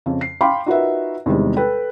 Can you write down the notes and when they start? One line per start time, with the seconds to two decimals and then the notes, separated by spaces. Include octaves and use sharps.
0.06 F2 C#3
0.21 C7
0.41 F5 G5 B5 C6 D6
0.66 D#4 F4 F#4 A#4 B4 E5
1.26 E2 C3 D#3 G3 G#3
1.57 A4 B4 G5